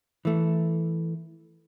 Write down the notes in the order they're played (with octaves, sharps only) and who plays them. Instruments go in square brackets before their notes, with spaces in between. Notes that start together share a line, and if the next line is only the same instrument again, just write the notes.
[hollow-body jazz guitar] E3 A3